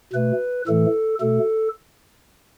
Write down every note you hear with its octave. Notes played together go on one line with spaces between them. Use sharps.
B2 A3 B4
A2 E3 A3 A4
B2 A3 A4